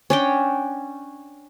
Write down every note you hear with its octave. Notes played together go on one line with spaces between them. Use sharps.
C#4 D4 G5